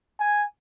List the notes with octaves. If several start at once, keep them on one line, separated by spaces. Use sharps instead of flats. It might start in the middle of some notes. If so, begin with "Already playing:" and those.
G#5